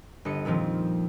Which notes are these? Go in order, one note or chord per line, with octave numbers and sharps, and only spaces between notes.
G1 D#5 C#7 D#7
F2 A#2 D#3 F3 C4